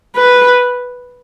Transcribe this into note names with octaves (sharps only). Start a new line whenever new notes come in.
B4